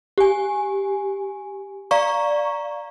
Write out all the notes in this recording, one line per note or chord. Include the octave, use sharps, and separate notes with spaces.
G4 G#5
D5 F5 A#5 C#6